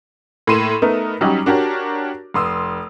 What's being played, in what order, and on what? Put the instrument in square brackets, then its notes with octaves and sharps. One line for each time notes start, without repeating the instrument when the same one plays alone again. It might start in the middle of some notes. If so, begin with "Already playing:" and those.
[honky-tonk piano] A2 A#3 C6 D#7 E7
A3 B3 D#4 A#4
F#3 G3 C#4 D#4 F#4 G4
D4 F#4 G4 A#4 C#5
F1 C6 D#6 E6